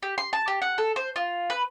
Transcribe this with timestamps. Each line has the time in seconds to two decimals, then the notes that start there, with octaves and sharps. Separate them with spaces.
0.03 G4
0.18 C6
0.33 A5
0.48 G4
0.62 F#5
0.78 A4
0.96 C5
1.16 F4
1.50 B4